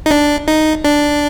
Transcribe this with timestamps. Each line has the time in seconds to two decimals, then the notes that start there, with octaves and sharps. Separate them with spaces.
0.06 D#4
0.11 D4
0.48 D#4
0.84 D4